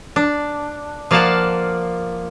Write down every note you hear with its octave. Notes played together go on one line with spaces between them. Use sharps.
D4
F3 A#3 D5 F5 F#5 A5